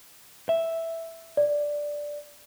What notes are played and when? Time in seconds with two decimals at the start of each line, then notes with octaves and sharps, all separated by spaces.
0.49 E5
1.37 D5